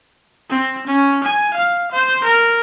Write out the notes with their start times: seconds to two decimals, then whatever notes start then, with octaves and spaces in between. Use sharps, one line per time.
0.49 C4
0.87 C#4
1.24 G#5
1.54 F5
1.92 C5
2.24 A#4